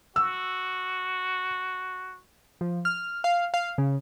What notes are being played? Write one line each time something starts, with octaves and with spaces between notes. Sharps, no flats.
F#4 E6
F3
F6
F5
F5
C#3